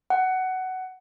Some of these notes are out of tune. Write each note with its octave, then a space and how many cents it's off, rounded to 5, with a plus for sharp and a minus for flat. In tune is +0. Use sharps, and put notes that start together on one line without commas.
F#5 +15